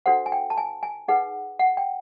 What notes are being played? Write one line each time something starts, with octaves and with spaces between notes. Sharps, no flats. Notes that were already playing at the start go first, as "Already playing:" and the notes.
D4 F#4 A4 C5 F#5
G#5
G5
A5
G#5
G#5
D#4 G#4 B4 F#5
F#5
G5